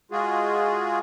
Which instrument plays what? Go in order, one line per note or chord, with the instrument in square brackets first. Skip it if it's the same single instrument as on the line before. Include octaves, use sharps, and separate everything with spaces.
[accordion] G#3 F4 F#4 G#4